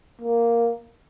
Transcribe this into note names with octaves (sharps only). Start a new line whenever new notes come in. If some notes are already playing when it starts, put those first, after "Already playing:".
A#3